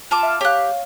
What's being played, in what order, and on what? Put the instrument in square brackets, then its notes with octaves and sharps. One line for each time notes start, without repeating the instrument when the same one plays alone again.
[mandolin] F4 A5 D6
[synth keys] E5 F6
[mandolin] G4 F#6 [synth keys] C#5 F5